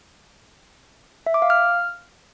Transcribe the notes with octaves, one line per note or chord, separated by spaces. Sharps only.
E5
D6
F5
F6